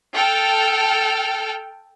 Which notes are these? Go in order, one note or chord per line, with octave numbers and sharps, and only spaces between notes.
A4 G5 F6